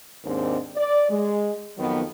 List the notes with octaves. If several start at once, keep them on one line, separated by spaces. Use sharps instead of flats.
D#2 G#2 D#3 C4 D4
D5
G#3
F2 D#3 F#3 B3